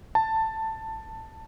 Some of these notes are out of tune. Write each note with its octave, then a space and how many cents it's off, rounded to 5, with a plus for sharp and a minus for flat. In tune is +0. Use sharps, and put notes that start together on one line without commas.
A5 +10